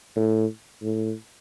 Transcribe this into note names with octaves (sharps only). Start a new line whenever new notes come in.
A2
A2